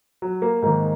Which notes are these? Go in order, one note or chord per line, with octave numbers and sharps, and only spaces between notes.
F#3
A#3
G#2 D#3 A#3